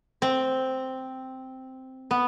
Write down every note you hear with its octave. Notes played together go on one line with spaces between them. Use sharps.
C4
B3